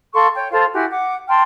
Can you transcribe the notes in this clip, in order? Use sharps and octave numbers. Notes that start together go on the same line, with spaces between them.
A4 F5 C6 C#6
C#5 G5
F4 A4 C5 F5
E4 F#4 G4 G#5
F#5 D6
G5 A5 C6 F6